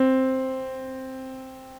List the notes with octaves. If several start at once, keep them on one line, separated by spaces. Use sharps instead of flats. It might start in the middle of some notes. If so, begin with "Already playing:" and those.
Already playing: C4